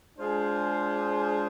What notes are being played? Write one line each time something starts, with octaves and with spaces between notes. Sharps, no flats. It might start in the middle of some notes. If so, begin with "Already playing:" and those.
G#3 D4 F4 G#4 C5